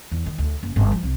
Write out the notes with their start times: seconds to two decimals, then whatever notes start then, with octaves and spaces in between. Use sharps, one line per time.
0.11 E2
0.26 D#3
0.38 D2
0.63 F#1
0.76 G1
0.92 F3
1.03 C2